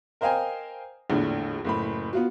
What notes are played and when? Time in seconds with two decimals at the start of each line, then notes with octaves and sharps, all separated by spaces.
0.21 A#4 C5 D#5 F5 G5 G#5
1.10 A#1 E2 A2 D3
1.64 F#1 A2 B5
2.13 B3 F4 F#4